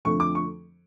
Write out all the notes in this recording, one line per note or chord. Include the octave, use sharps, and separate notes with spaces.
F2 D3 F3 A3 C#6
D6
C#6